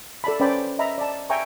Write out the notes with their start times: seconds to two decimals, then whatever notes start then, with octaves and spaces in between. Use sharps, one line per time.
0.24 A4 D5 A5 B5
0.40 C#4 B4 C5 D5 G5 B5
0.79 D#5 E5 A#5 B5
0.98 D5 A5
1.30 E5 G5 G#5 A#5 C#6